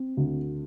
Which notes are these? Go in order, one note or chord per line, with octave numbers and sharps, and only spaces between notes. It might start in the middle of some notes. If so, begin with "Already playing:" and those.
Already playing: C4
D2